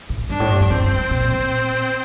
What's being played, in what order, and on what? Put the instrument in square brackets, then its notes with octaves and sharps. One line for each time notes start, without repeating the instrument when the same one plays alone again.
[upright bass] A2
[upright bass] G2 [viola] D4
[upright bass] A2
G2
F2
[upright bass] G2 [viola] C4
[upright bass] G2
G2
A#2
A#2